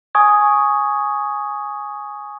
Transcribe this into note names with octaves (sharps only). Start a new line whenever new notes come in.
G#5 C#6 D#6 G#6